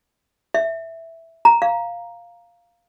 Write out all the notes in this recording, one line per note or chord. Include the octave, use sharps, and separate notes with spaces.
E5
A#5
F5